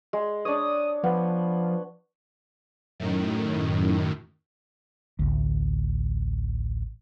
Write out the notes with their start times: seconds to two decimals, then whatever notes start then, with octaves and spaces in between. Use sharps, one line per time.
0.13 G#3
0.45 D4 C#5 D#6
1.03 F3 B3
3.00 F#2 A2 D#3
5.19 A1 D2